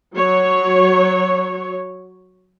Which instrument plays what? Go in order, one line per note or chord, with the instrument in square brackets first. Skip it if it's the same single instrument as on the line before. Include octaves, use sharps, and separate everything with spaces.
[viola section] F#3 C#5